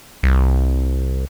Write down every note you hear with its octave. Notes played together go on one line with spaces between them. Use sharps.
C2